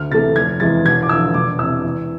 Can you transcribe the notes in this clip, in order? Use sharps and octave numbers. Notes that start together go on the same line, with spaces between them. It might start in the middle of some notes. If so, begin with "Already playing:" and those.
Already playing: D2 F6
C3 E3 A3 A6
F1 G#6
E2 C3 E3 G#3 A6
E1 G#6
D6
E2 D3 F3 E6
E1 D6
E2 C3 E6
E2